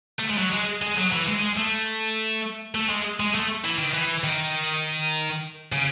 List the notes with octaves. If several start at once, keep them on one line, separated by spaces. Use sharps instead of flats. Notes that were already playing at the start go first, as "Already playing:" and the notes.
A3
G#3
F#3
G#3
G#3
F#3
E3
G#3
G#3
A3
A3
G#3
G#3
A3
E3
D#3
E3
D#3
C#3